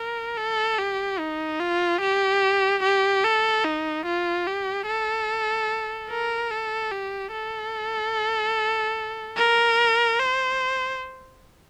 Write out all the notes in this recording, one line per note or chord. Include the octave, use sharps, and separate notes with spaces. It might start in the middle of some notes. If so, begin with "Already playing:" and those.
Already playing: A#4
A4
G4
D#4
F4
G4
G4
A4
D#4
F4
G4
A4
A#4
A4
G4
A4
A#4
C5